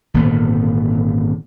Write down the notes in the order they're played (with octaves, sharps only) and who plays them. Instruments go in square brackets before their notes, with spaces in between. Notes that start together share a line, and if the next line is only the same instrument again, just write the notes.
[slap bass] G#1 A#2 D3 B3